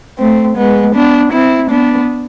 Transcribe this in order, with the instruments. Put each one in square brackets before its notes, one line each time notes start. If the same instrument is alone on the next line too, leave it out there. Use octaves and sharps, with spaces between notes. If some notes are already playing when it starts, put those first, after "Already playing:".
[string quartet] A3 C4
G#3 B3
B3 D4
C4 E4
B3 D4